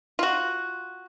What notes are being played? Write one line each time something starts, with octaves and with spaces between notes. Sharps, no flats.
F4 F#4